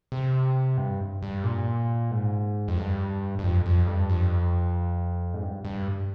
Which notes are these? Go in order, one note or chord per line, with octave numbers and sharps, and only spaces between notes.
C3
G2
G2
A#2
G#2
F2
G2
G2
F2
F2
G2
F2
G#2
G2
G2